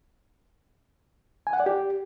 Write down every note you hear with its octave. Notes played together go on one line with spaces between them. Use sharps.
G#5
F#5
D5
G4